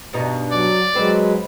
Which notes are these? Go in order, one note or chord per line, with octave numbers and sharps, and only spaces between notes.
G2 B2 D#4
F#3 D5
F#3 G#3 C4 B4